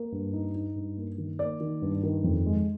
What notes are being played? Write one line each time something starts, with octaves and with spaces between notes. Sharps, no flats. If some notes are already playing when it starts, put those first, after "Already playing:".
Already playing: A#3
G2
D#4
D#4
G2
A#3
D#3
A#3 D5
D#3
G2
D#3
F2
G#3